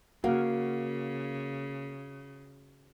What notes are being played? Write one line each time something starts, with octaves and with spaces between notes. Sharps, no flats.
C#3 A#3 F#4 F5 F#5